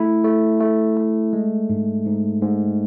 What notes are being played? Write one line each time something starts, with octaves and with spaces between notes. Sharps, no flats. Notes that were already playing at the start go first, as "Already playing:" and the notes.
Already playing: A3 E4
A3
A3
A3
G#3
G#2
G#2
G#2